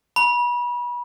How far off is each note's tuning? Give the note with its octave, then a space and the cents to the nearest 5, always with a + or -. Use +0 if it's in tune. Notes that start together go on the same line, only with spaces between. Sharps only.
B5 -30